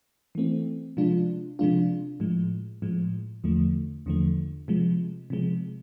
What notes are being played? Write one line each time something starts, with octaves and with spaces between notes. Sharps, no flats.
E3 A3 C4
C3 F3 G#3 D4 F4
C3 F3 G#3 D4 F4
A2 F3 G#3
A2 F3 G#3
E2 D3 F3 A3
E2 D3 F3 A3
C3 F3 G#3
C3 F3 G#3